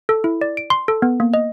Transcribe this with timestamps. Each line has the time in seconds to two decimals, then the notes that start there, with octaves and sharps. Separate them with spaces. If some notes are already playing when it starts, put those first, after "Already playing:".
0.09 A4
0.24 E4
0.41 D5
0.57 D7
0.70 C6
0.88 A4
1.02 B3
1.20 A#3
1.34 D#5